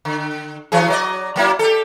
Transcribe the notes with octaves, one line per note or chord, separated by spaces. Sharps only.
D3
E3 F#3 G#4
F#3 D5 D#5
F#3 A#3 E4
G4 A4